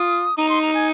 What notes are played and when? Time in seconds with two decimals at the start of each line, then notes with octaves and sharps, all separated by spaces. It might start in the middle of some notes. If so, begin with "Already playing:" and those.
Already playing: F4 D#6
0.38 D#4 A#5
0.49 C6
0.62 A#5
0.74 G#5